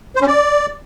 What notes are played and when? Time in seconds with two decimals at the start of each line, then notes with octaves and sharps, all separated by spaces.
0.16 C5
0.21 C#4
0.27 D5